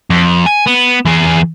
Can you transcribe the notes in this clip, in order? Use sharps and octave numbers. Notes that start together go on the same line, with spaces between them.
F2
G#5
B3
E3 G#4